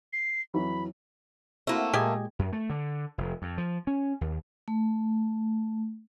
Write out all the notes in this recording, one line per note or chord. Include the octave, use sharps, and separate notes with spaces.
C7
F2 E3 F#3 B5
A3 A#3 C4 E4 F#4
A#2 G#3 G4 D#5 G#5
F#2
A3
D3
F1
F2
F3
C#4
D#2
A3